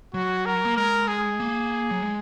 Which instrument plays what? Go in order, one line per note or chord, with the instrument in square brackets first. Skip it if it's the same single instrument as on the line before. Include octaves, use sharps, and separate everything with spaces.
[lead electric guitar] F#3 [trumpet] F#4
[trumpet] A#4
[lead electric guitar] A#3
[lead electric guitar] G#3 [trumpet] A#4
[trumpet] G#4
[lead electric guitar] A#3
F#3
G#3